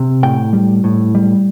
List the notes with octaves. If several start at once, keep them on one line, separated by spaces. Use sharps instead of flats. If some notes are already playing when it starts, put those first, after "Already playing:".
Already playing: C3
A2 G5
G3
A2
G3